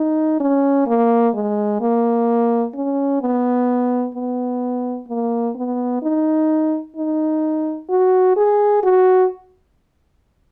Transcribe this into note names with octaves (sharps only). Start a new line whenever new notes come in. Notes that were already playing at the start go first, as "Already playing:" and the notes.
Already playing: D#4
C#4
A#3
G#3
A#3
C#4
B3
B3
A#3
B3
D#4
D#4
F#4
G#4
F#4